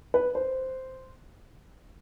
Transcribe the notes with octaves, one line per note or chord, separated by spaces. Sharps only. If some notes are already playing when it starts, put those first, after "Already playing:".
B4
C5